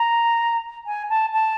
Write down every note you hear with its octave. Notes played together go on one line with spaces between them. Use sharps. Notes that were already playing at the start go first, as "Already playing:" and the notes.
Already playing: A#5
G#5
A5
A5